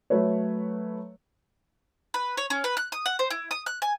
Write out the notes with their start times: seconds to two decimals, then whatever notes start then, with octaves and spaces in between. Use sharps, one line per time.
0.10 F#3 A3 B4 C#5
2.14 B4
2.37 C#5
2.50 C#4
2.64 B4
2.77 F#6
2.92 D#6
3.06 F#5
3.19 C5
3.30 E4
3.51 D#6
3.66 F#6
3.82 G#5